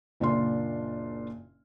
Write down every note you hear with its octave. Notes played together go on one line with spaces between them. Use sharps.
F#1 A#2 D4 F4 C6